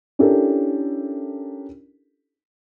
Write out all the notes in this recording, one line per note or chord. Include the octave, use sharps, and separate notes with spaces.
C#4 D4 E4 G4 A4 A#4